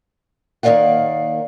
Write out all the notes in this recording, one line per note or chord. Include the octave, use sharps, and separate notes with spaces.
D#2 D#3 A#3 D5 F5 F#5